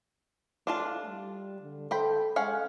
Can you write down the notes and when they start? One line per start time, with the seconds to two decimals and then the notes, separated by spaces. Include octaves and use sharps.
0.67 A3 D4 F4 A5
1.06 G3
1.61 D3
1.91 A4 C5 G5 B5
2.36 G#3 C#4 F5 F#5